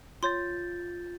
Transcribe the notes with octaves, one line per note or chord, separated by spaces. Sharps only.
F4 C#5 C6 G6 A6